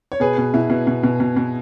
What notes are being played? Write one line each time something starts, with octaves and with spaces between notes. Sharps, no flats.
C#5
B2 G#4 B4
B2
B2 E4
B2
B2
B2
B2
B2